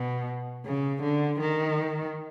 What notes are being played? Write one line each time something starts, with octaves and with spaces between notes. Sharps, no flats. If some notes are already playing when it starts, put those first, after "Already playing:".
Already playing: B2
C#3
D3
D#3